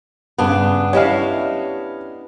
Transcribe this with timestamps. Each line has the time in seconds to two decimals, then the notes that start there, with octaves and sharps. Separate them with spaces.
0.38 G2 C#3 B3 D4
0.93 C#4 E4 G4 C#5 D#5 F5